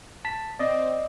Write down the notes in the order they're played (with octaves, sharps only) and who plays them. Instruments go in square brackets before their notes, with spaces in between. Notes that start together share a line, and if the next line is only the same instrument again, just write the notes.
[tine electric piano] A5 B6
[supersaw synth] C4 [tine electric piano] D5 D#5